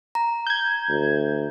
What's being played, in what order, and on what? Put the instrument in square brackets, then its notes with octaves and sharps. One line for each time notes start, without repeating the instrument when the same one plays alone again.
[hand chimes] A#5
[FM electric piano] G6 G#6
[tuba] D2